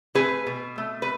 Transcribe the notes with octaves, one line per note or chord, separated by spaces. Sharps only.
A3 G#4 B4
B2
A3
B4